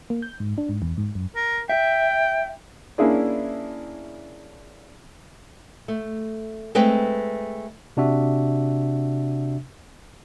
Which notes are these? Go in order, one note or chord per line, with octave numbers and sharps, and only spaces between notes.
A#3
G6
G#2
D4
G#2
E2
G#2
F#2
A#4
E5 G5
A#3 C#4 D4 E4 G#4 D5
A3
G#3 A3 C4 B4 G5
C3 D4 F#4 E5